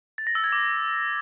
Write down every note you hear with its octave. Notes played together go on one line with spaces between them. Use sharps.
A6
A#6
E6
G#6
D6